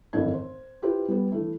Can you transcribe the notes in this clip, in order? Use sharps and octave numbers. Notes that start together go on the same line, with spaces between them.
G#1 F#2 A2 E3 D#5 G#6
C5
E4 F4 G4 B4 C5
G3 B3
E3 A3